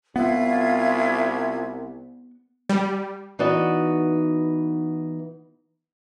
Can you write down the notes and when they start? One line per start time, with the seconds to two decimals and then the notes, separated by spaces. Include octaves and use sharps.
0.16 C2 B3 F4 E5 G#6
2.69 G3
3.39 E3 B3 D#4 F#4 D5 D#5